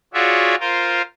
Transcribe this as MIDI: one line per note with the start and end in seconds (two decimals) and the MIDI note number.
0.14 0.55 65
0.14 0.55 66
0.14 0.55 68
0.14 0.55 73
0.14 0.55 74
0.14 0.55 76
0.60 1.02 65
0.60 1.02 70
0.60 1.02 72